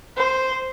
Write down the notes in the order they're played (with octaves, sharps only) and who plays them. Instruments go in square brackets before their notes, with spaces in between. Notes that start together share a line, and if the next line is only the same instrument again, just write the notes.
[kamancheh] C5